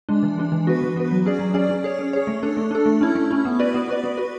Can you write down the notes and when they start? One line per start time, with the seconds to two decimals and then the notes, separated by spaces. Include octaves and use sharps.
0.09 G#3 D4
0.23 E3
0.38 G#3 D4
0.52 E3
0.67 B3 F#4 B4
0.82 E3
0.96 B3 F#4 B4
1.11 F#3
1.26 C#4 G#4 D5
1.39 F#3
1.54 C#4 G#4 D5
1.69 C#4
1.84 G#4 C#5
1.99 C#4
2.13 G#4 C#5
2.27 A3
2.43 D4 A4
2.57 A3
2.71 D4 A4
2.86 A3
3.01 C#4 E4
3.15 A3
3.31 C#4 E4
3.45 B3
3.59 F#4 B4 D5
3.74 B3
3.88 F#4 B4 D5
4.04 B3
4.17 F#4 B4